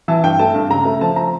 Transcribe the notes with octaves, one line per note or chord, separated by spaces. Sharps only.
E3 A5
G2 G5
A3 A5
G2
C#3 A#5
A3
F3 A5
A#5